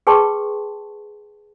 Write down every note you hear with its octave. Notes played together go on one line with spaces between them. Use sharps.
G#4 B4 G5 A5 C6 C#6